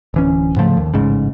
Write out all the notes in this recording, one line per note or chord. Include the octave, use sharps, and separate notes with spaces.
D1 E3 C#4
G#2 C#3 F3 A3
D#2
A1 G#2 C#3